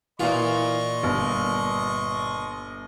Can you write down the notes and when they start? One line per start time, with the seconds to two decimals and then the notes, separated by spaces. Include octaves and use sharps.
0.20 A#2 E3 F4 D#5 C6 C#6
1.03 G1